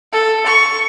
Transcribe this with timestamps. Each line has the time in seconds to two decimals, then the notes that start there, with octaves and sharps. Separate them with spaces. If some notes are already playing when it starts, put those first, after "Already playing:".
0.13 A4
0.46 C#6